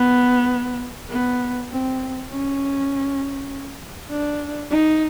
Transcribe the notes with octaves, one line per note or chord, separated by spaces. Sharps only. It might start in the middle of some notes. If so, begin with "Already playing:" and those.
Already playing: B3
B3
C4
C#4
D4
D#4